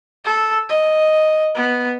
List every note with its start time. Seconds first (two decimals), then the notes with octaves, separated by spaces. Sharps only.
0.25 A4
0.69 D#5
1.55 B3